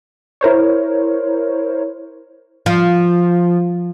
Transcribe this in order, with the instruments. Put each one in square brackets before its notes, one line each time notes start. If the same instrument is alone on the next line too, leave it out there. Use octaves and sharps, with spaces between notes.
[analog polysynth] E4 A#4 C5 C#5
[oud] F3